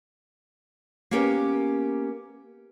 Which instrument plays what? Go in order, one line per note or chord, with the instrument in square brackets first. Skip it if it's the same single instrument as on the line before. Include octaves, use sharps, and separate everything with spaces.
[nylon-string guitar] A#3 B3 C#4 G4 A#4